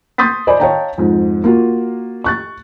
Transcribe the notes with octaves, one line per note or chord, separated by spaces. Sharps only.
C6 D#6 G6 A6 B6
C5 D5 D#5 G#5 B5
C#5 D#5 F5 G5 A5 A#5
F2 G#2
A#3 F4 F#4
C#6 F#6 A6